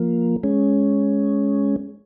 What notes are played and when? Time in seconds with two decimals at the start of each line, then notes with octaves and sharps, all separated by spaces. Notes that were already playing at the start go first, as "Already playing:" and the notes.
Already playing: F3 A#3
0.43 G#3 C#4